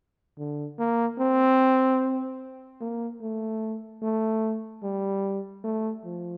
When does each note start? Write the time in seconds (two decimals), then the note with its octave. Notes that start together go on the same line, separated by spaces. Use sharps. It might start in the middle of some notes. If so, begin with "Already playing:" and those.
0.38 D3
0.79 A#3
1.19 C4
2.81 A#3
3.21 A3
4.02 A3
4.83 G3
5.64 A3
6.05 F3